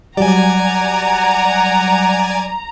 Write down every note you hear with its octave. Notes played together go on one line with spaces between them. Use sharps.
F#3 G3 D5 F#5 G#5 A#5